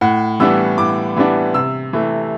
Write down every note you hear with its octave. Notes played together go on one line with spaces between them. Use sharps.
A2 F#5
E3 G3 B3 D4 E6
A2 D6
E3 G3 B3 D4
C3 E6
E3 A3